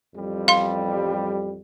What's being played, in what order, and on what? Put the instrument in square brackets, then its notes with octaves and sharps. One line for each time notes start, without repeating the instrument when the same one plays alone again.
[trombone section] A1 F2 G3
[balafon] F5 C6